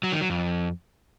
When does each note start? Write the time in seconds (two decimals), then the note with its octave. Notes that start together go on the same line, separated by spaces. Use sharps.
0.03 F#3
0.12 D#3
0.21 F#3
0.30 F2